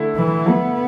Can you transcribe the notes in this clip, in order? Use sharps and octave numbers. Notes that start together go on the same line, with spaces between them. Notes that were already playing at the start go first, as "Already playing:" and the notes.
Already playing: D3 A3 E4
E3
B3